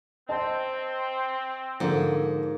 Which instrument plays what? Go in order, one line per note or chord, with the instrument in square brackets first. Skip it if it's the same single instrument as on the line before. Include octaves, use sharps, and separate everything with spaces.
[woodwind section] C4 [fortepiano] D#5 A5
[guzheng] G#2 A#3 [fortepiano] D3 F3